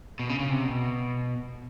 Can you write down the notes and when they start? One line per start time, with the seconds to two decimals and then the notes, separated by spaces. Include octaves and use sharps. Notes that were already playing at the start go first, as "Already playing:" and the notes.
0.20 B2
0.29 C#3
0.39 C#3
0.50 C3
0.64 B2